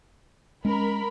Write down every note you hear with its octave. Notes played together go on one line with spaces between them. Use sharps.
G#3 C#4 A#4 B5